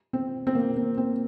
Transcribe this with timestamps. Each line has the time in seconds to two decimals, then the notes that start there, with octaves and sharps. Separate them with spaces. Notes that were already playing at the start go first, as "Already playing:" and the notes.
0.13 C4
0.47 C4
0.55 A#3
0.76 C4
0.97 C4